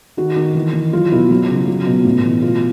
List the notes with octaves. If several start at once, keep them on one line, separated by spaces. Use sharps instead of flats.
D#3 F#4
D#3
E3
E3
F#3 F4
B2 E4
F#3 F4
C#3
F#3
B2
A2
E3
B2 F4